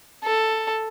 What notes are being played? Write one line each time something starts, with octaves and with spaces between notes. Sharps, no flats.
A4